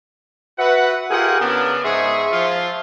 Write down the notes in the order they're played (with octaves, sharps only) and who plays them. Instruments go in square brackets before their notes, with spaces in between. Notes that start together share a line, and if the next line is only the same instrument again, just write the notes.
[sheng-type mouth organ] F#4 E5 [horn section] B4 F#5
[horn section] F4 G#4 F#5 [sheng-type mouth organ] G4 A#4 G#5
[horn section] C#3 B3 D4 [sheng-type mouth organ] A#4
[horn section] G#2 G#4 [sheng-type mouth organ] E5 C6 C#6
[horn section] F3 F4